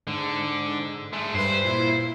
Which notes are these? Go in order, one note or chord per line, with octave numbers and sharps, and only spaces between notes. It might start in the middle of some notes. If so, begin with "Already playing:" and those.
G#2 D3
G#3 A3
G2 B4 C5
A#2 E4